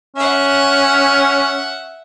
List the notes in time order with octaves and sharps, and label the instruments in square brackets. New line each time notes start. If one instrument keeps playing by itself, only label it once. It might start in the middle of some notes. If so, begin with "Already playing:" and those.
[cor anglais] C#4 [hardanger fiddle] E5 F#5